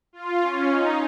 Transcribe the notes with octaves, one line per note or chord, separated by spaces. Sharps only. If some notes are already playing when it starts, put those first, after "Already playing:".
F4
C#4
D#4